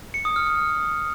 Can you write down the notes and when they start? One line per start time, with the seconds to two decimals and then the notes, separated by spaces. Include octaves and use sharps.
0.14 C#7
0.25 D#6
0.36 F6
0.47 F6